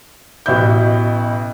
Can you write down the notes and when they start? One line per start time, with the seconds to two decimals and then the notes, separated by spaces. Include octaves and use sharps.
0.46 A1 B2 F#4 E5 B5 G6